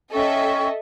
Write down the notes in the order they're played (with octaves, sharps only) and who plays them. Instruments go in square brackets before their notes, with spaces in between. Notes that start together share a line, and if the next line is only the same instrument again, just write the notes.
[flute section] C#4 G5 C#6 [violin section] A4 D#5 E5